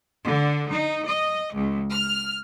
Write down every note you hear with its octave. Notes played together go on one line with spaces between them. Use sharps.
D3
D#4
D#5
C#2
F6